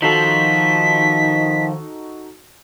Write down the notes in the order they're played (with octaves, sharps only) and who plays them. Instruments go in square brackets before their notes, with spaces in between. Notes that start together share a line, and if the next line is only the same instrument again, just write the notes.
[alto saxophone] D#3 [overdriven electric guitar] F3 [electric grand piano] D#4 F#4 A4 [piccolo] B6